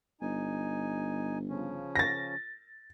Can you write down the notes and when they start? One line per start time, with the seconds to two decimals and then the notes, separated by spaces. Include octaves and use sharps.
0.21 G1 D#4 G#5
1.49 C#3 F3 C#4
1.96 A6 A#6